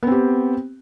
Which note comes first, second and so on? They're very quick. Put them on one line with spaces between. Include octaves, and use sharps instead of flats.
B3 C4 G4